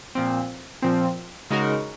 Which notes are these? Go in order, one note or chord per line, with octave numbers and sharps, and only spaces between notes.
A#2 F3 C4
A#2 F3 C4
C#3 G#3 D#4 F#4 A#4